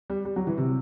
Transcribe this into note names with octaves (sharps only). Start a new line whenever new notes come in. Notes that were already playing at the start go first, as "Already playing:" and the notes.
G3
G3
F#3
E3
C3